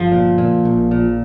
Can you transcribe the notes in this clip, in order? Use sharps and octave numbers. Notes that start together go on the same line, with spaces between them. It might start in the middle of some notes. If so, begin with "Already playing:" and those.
Already playing: G1 F3
A#2
A#2
A#1
A#2